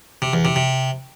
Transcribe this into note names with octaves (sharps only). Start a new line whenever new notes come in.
C3
E2
C3
C3